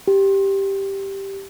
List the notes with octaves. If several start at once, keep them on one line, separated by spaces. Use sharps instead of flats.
G4